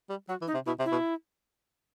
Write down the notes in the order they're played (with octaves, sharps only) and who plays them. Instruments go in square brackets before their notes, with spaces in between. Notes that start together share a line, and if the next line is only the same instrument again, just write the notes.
[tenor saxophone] G3
[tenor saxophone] F#3 [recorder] F#4
[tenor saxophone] E3
[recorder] D#4
[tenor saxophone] C3
[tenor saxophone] B2 [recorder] E4
[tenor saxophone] C3
[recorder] E4
[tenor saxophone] B2